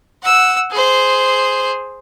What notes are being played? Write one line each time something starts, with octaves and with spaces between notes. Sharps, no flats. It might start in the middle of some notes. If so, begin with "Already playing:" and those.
F#5 E6
G#4 C5